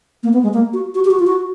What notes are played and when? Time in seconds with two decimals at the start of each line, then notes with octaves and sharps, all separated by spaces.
0.23 A#3
0.33 B3
0.43 G#3
0.54 A#3
0.73 F#4
0.95 F#4
1.05 G4
1.11 F#4
1.19 F4
1.27 F#4